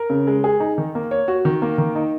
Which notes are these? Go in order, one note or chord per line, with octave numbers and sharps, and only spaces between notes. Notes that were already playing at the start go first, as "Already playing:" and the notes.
Already playing: A#4
C#3
G#3
G#4
D#4
D#3
A#3
C#5
F#4
D#3
A#3
D#3
D#4